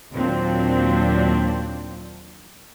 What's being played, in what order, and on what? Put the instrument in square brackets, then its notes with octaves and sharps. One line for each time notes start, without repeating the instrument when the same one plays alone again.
[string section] D#2 A#2 F#3 C4 D4